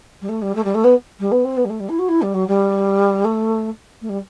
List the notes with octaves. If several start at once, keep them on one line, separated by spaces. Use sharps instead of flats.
G3
A3
G3
A3
G3
A3
B3
G3
B3
C4
B3
G3
A3
G3
E4
F#4
E4
G3
F#3
G3
A3
A3
G3